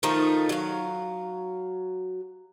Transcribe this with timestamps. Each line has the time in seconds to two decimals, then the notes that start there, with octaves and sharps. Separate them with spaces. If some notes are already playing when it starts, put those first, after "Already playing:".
0.03 D#3 F3 A3 D#4
0.49 F#3 F5